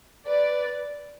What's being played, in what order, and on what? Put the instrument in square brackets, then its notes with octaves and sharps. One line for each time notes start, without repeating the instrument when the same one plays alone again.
[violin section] B4 D5